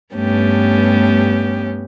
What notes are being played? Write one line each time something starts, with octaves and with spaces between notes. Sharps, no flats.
G2 A3 B3 C#4 G4